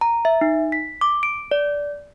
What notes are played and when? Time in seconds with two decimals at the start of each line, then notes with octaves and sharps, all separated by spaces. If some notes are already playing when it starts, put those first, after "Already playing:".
0.01 A#5
0.25 E5
0.41 D#4
0.72 B6
1.01 D6
1.23 D7
1.51 D5